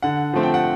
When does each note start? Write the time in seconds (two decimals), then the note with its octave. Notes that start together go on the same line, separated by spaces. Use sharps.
0.02 D3 F#5
0.33 F3 A3 C4
0.43 G5
0.54 F#5